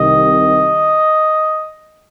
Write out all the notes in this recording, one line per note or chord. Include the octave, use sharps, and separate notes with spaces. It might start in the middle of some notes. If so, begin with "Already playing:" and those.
Already playing: C2 C3 D#3 D#5